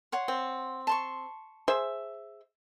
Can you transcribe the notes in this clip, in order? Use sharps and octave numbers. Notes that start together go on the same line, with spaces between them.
C#5 F#5 C6
C4
A5 C6 C#6
G#4 C5 E5